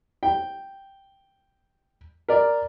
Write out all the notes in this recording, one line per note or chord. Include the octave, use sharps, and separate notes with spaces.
G5
A#4 D5